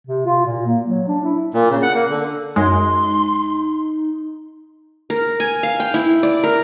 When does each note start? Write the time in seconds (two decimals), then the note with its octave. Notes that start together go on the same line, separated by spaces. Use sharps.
0.07 C3
0.26 F4
0.45 A#2
0.66 A#3
0.86 F#3
1.08 D4
1.24 E4
1.54 A#2
1.70 C#3
1.82 F#5
1.95 A#3
2.10 D3
2.56 F#2 G#3 D#4 C6
5.10 A#4
5.40 G#5
5.63 F5
5.80 G5
5.94 E4
6.23 D5
6.44 A#4